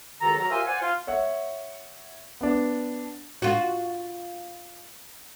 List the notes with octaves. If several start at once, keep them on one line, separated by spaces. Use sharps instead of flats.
C#2 D#3 F#4 A4 A#5
F#3 A#5
F4 G4 A#4 C5 E5 G#5
C5 D5 F#5 G#5
F4
C#5 E5 F#5
B3 D4
F4 F#4